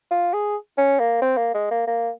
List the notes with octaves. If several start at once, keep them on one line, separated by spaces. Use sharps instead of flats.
F4
G#4
C#4
A#3
C4
A#3
G#3
A#3
A#3